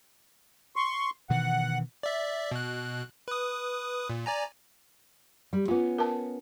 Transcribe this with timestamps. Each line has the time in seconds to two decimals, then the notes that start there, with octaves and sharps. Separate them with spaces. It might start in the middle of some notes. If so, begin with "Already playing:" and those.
0.76 C6 C#6
1.30 B2 D#3 E3 F#5
2.03 D5 E5
2.51 B2 F#6
3.28 B4 D#6
4.10 A#2
4.26 D5 G#5 A#5
5.53 G3
5.68 B3 C#4 F4
5.98 A#4 A5